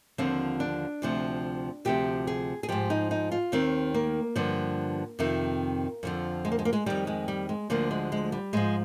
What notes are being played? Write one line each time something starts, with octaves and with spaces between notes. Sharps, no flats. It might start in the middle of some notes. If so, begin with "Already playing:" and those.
D#2 D3 F3 C4
D4
D2 C3 F3
D2 C3 F3 G4
G#4
G#4
G#2 F3 G4
D#4
D#4
F4
D#2 D#3 C4
A#3
G2 D3 F3
F2 C3 D#3
F2 D3 F3
G#3
A#3
G#3
A#3
G#3
F2 D#3 G3
G#3
G3
G#3
D2 D3 F3 A#3
G#3
G#3
G3
G#2 F3 G#3